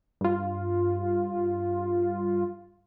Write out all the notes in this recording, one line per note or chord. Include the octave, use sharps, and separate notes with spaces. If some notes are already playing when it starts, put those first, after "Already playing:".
G2 F4